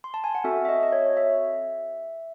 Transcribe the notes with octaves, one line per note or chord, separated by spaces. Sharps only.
C6
A5
G#5
F#5
C4 F#4 A4 E5
E5
D#5
D#5
C#5
E5